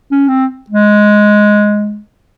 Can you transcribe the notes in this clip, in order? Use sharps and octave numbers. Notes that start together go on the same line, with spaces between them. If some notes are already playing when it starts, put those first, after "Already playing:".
C#4
C4
G#3